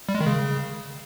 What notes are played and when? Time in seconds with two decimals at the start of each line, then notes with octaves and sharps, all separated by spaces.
0.09 G3
0.15 G#3
0.21 D#3
0.27 C#3